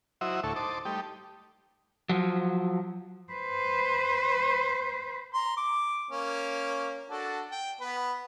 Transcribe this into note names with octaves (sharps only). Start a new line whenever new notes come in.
F#3 E4 F#4 C5 D#5 E5
D2 A2 E4 A4 C#6
D#4 C5 A5 D6
G3 A3 D#4 G4
F3 F#3
B4 C5
A#5 C6
D6
A#3 C#4
D4 F#4 A4
G5
B3 B4